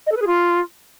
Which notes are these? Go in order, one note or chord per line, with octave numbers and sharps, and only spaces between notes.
D#5
A4
B4
G#4
F4